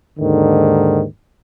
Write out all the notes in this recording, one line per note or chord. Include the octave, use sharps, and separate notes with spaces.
D#2 G#2 D3 D#3